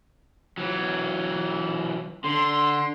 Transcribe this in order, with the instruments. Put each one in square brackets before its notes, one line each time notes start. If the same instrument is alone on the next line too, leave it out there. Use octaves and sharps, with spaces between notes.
[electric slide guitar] E3 F#3
[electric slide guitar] D3 [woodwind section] C6